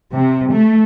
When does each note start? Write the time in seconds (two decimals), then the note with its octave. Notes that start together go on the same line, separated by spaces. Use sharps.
0.13 C3
0.52 A3